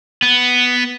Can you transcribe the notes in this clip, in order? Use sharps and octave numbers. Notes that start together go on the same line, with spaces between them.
B3